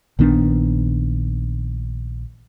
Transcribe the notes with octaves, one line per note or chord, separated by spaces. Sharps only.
A#1 D#3 B3 D4